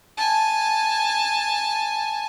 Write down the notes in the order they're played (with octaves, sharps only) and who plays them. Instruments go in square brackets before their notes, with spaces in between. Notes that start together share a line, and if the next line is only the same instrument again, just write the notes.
[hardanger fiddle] G#5 A5